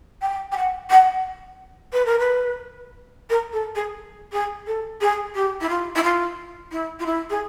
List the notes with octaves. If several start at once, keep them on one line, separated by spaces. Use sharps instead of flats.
G5
G5
F#5
F#5
B4
A#4
B4
A#4
A4
G#4
G#4
A4
G#4
G4
E4
F4
E4
F4
E4
F4
E4
G#4